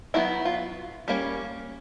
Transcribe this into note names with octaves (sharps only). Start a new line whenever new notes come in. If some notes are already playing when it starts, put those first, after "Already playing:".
D#3 F#3 B3 E4
F4
G3 A#3 C#4